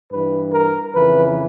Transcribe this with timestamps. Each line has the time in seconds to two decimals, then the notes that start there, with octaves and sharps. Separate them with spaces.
0.12 G2 E3 B4
0.53 A#4
0.94 F2 C#3 E3 B4